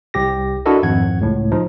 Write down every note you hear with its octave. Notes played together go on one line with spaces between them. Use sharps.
C2 G4 A#6
D4 E4 F#4 A4 A#4 D#5
G#1 F2 F#5 G#6
C#2 A2
F3 D#4